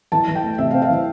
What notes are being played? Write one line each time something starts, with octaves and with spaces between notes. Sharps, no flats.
E3 A5
E3
G5
A3
C3 E5
F5
C4
F5
E3